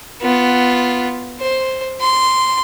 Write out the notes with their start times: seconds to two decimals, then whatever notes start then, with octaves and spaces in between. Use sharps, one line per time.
0.22 B3 F4
1.40 C5
2.01 C6